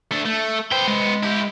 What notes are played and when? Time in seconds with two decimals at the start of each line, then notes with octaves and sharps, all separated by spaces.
0.11 A3 D4
0.25 A3
0.72 B3 C5 G5
0.88 G#3
1.23 E4 G4